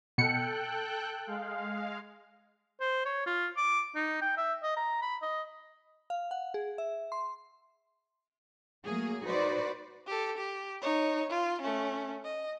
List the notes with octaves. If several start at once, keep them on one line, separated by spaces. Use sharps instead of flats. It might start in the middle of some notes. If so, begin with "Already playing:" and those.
B2 A4 G5 F#6 C#7
G#3 F5
C5
C#5
F4
D6
D#4
G5
E5
D#5
A#5
B5
D#5
F5
F#5
G#4
E5
C6
F#3 A3 A#3 G#4
D#4 F#4 B4 C5 D5
G4 A4
G4
D#4 C#5
F4
A3 C#4
D#5